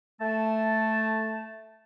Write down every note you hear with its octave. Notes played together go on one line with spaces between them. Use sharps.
A3 A5